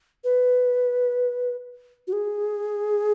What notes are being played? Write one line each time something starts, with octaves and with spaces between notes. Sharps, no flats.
B4
F#4
G#4